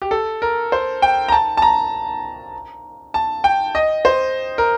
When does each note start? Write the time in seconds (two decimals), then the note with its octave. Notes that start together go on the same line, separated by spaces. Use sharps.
0.02 G4
0.11 A4
0.42 A#4
0.72 C5
1.02 G5
1.28 A#5
1.32 A5
1.57 A5
1.62 A#5
3.14 A5
3.44 G5
3.75 D#5
4.05 C5
4.58 A#4